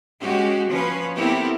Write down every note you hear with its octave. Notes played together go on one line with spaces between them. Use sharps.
G#3 C#4 F#4 G4
F3 C#4 B4
B3 C4 E4 G4 A4 A#4